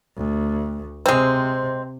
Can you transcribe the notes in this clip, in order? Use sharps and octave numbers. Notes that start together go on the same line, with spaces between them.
D2
C3 G#3 C4